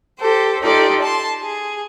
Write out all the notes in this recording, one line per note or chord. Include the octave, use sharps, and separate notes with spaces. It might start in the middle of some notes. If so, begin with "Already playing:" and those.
G4 A4 C5
D#4 F4 G4 A4 D5
A5 C6
G#4